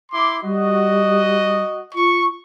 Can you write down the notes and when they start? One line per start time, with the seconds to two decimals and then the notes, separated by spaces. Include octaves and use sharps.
0.12 E4 C6 D6
0.43 G3 F#4 D#5
1.95 F4 C#6